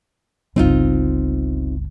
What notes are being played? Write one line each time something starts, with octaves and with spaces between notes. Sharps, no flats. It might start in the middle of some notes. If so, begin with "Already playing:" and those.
G1 C#2 C4 D#4 F4